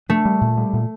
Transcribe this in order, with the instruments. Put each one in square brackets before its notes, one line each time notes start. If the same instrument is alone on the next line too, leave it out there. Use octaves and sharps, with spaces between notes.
[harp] A3 [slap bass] D4
[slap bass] G3
A#2
G3
A#2